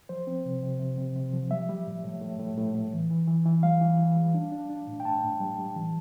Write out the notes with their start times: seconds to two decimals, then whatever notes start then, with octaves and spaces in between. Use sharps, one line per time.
0.09 F3 C5
0.27 C4
0.45 C3
0.63 C3
0.80 C3
0.98 C3
1.16 C3
1.33 F3
1.51 G3 E5
1.69 G3
1.87 A2
2.04 A2
2.21 A2
2.39 A2
2.57 A2
2.75 A2
2.93 E3
3.10 E3
3.28 E3
3.46 E3
3.63 G3 F5
3.81 E3
3.99 E3
4.16 G3
4.34 D4
4.52 D4
4.70 D4
4.87 A2
5.00 G5
5.05 A2 A5
5.23 A2
5.40 G3
5.58 G3
5.76 E3